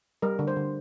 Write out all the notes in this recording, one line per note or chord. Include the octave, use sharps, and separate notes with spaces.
G3 A#4
D3
C5
D3